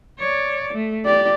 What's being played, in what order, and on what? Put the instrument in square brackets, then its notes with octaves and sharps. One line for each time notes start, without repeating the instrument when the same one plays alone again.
[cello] C#5 D5
A3
[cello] G4 [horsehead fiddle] D5